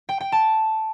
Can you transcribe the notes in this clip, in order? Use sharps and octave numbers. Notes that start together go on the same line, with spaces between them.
G5
G5
A5